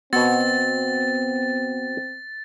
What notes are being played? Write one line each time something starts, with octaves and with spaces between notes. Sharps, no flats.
B2 B3 C4 F#4 A6